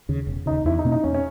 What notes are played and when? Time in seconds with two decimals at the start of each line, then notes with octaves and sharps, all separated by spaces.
0.09 D#2 C#3
0.27 E1
0.46 D#2 C#3 D#4
0.65 E2 E4
0.79 D#4
0.85 B2 A#3 C#4
0.92 D#4
1.04 E2 C#4
1.14 C#4